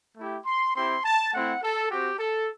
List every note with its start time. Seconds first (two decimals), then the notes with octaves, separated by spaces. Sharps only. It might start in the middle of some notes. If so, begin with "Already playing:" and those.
0.17 A3 E4 G4
0.46 C6
0.75 C4 E4 G4 C6
1.04 A5
1.33 A3 C4 E4 F#5
1.62 A4
1.90 C4 F#4 G4
2.19 A4